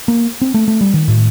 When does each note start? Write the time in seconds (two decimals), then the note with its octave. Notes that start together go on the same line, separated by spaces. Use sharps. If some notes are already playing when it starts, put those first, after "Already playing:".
0.08 A#3
0.42 C4
0.54 A3
0.68 A3
0.81 G3
0.94 D#3
1.08 A2